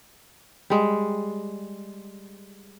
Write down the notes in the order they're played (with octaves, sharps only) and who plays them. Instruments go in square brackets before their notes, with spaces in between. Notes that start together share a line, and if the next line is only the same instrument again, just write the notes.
[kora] G3 G#3